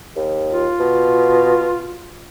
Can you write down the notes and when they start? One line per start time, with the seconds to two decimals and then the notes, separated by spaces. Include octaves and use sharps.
0.16 D#2
0.52 F4
0.80 B2